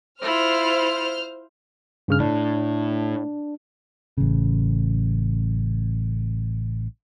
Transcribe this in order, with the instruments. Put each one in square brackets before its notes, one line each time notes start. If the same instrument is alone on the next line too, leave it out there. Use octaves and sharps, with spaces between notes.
[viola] E4 F4 [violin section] C5 F6
[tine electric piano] G2 C#3 F6
[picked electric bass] A2 [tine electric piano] D4
[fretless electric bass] A1 C#3